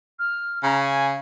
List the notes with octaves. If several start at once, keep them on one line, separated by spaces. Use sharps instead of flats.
F6
C#3 A#5
G#5